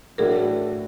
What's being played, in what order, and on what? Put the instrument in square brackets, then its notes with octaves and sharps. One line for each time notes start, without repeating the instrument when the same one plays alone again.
[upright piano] A2 F#3 A3 D4 F#4 [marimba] G#4 A#4